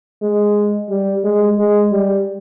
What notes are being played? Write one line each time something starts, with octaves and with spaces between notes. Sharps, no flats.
G#3
G3
G#3
G#3
G3